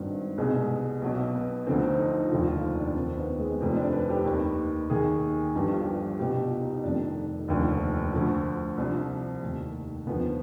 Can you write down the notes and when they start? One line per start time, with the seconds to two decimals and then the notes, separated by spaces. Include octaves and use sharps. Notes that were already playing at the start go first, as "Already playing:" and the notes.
Already playing: G#1 G2 D#3 C4
0.38 C2 B2 G#3
1.02 B1 B2
1.35 B3
1.67 D2 D3 F3 C4
1.83 D#4
1.99 D#4
2.15 F4
2.31 F1 D#2 D3 F3 F4
2.47 F4
2.64 D#4
2.80 D4
2.96 D#2 D#3 C4
3.17 B3
3.39 G#3
3.60 F1 F2 C3 D#3 C4
3.76 D4
3.93 B4
4.09 G4
4.25 D#2 D#3 B4
4.90 D#2 D#3 G#4
5.55 G1 G2 F3 G4
5.68 F4
5.82 G4
6.19 C2 B2 G4
6.40 F4
6.62 D#4
6.84 F1 F2 D#3 D4
7.48 F1 D#2 D3 F3
8.13 D2 D3 F3
8.77 C2 C3 F3 D4
9.43 F1 D#2 D#3
10.07 D#2 D3 F3 B3